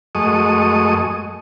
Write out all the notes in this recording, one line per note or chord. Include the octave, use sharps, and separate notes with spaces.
F#2 G#3 A3 D#5 C#6 D#6